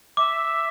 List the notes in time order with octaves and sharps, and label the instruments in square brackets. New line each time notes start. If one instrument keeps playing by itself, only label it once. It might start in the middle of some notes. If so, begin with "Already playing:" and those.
[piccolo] E5 [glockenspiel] D6